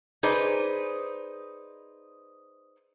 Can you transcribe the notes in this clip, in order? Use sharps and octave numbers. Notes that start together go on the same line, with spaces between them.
D#4 G#4 B4 C5 D5